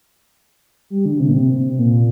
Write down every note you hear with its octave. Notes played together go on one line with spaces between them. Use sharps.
G3
D3
C3
A#2
C3
C3
A#2